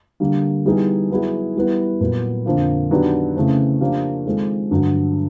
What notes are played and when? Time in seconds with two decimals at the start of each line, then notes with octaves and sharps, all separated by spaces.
0.20 D3 G3 A#3
0.65 E3 G3 B3 D#4 G#4
1.10 F#3 B3 E4 G#4
1.55 E3 G3 B3 E4
2.00 A#2 F#3 B3
2.46 F2 D3 F3 A#3
2.90 D#3 F#3 B3 D4 G4
3.36 C#3 E3 A3 C4
3.81 F3 A#3 D4 G4
4.26 D#3 G#3 C4 F4 A4
4.71 G2 D3 F#3